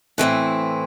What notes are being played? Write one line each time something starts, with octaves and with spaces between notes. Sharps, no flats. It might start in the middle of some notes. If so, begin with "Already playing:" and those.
A2 E3 C4 E4